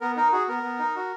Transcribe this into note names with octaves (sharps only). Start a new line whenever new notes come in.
B3 A#4
D#4 A#4
F#4 G#4
B3 A#4
B3
D#4
F#4